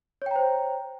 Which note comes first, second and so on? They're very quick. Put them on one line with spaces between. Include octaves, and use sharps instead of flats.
C#5 G5 A#5 C5